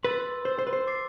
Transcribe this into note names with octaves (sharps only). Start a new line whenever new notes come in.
B4 C6 E6 A6
C5 C6 E6 A6
C5
B4
C5
D6 A6 C7